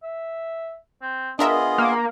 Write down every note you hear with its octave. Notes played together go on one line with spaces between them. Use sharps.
E5
C4
B3 D4 F4 G#4 A#4 D#5 E5
A#3